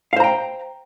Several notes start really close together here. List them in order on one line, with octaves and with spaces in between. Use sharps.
F5 C5 A#5 G5